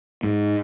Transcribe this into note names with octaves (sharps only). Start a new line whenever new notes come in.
G#2